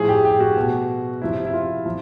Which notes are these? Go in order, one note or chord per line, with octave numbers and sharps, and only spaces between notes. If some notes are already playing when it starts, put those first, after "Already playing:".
Already playing: A2 F3 G#4
G4
G4
F#4
B2
C3 F3 E4
E4
F4
F3